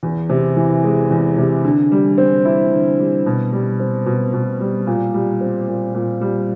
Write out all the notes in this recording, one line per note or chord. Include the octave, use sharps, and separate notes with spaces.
E2
C3
E3
G#3
E2
C3
D3
G3
C4
E4
D3
G3
B2
G3
C4
B2
B2
G3
A#2
G3
C4
A#2
A#2
G3